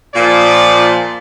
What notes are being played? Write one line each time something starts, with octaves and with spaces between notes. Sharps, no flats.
A#2 F3 D5